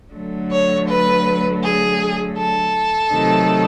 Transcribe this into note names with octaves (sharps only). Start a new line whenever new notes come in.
D3 F#3 A3
C#5
B4
G#4
A4
C3 D#3 F#3 A3